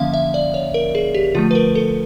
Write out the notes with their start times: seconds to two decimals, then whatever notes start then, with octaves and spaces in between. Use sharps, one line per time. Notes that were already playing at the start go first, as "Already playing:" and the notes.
Already playing: D3 F3 A#3 C#4 E5 F5
0.14 E5
0.34 D5
0.54 C#5
0.74 A#4
0.95 G#4
1.14 G4
1.35 D3 F3 A3 F4
1.51 B4
1.55 A#4
1.75 A4